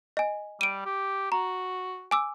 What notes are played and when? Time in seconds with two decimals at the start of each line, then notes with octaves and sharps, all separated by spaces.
0.17 D#5 G#5
0.61 G3 D7 D#7
0.86 G4
1.32 F#4 A#5
2.11 G#5 D6 E6